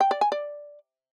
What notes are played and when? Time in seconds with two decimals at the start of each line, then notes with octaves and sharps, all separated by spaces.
0.01 G5
0.11 D5
0.21 G#5
0.32 D5